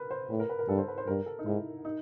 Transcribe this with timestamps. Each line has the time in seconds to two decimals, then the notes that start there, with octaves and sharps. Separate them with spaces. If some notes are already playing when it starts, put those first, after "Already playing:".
Already playing: A#4 B4
0.11 C5
0.30 A2 B4
0.40 A#4
0.49 B4
0.59 A#4
0.69 G2 A4
0.78 C5
0.88 B4
0.98 C5
1.07 G2 A#4
1.26 A4
1.39 D#4
1.46 G#2 E4
1.85 D#4